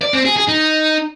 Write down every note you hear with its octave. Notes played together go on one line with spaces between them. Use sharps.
D5
C4
G#4
G#4
D#4